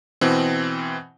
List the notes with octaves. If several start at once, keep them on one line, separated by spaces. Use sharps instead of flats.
B2 E3 C4